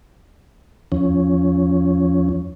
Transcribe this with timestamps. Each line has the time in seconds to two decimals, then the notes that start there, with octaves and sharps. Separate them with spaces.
0.92 E2 F3 C#4